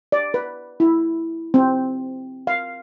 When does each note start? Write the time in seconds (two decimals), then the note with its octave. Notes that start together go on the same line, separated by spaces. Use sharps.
0.12 D5
0.34 B4
0.80 E4
1.54 C4
2.47 F5